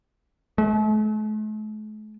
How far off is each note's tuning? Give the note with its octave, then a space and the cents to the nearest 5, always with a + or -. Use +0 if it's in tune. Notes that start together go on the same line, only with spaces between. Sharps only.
A3 -45